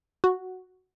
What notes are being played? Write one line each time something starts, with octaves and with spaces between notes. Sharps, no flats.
F#4